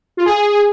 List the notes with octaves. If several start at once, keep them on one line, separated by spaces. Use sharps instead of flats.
F4
G#4